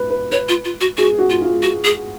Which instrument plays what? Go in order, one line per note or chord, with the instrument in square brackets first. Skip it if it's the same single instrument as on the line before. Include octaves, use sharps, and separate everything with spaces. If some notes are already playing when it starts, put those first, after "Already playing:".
Already playing: [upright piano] B4
B4
[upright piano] B4 [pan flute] C#5
[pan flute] F4
F4
F#4
[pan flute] F#4 [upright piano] G#4
[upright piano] F#4
[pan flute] F4
[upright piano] F4
[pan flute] F#4
G#4